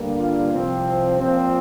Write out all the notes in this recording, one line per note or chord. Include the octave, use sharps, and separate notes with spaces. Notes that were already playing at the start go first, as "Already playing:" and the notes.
Already playing: G2 D3 G3 A#3
F4
C2 C3 F3 C4
A#2 F3 C4